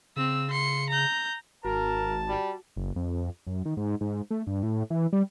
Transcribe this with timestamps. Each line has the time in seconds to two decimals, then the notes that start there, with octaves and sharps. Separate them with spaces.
0.16 C#3 C4 E6
0.51 C6 C#7
0.90 A#5 G6
1.65 G#1 F#4 A#4 A5
2.28 G3
2.76 F#1
2.96 F2
3.47 F#2
3.65 D#3
3.77 G#2
4.01 G#2
4.31 A3
4.47 G2
4.63 A2
4.90 E3
5.13 G3